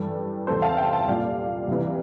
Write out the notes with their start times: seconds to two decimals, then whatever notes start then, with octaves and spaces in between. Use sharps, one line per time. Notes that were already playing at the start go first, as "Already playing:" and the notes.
Already playing: G2 E3 G3 A4
0.47 E2 C3 E3 G3 A4 C5
0.62 F5 A5
0.77 E5 G5
0.92 F5 A5
1.07 C2 A#2 G3 D5 F5
1.68 C2 C3 E3 G3